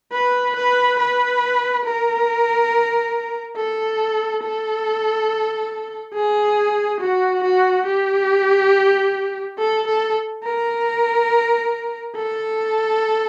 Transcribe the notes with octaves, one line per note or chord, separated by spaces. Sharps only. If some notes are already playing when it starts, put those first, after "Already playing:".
B4
B4
B4
A#4
A4
A4
G#4
F#4
F#4
G4
A4
A4
A#4
A4